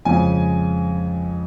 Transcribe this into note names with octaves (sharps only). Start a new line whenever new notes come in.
F2 C#3 F3 G#3 G#5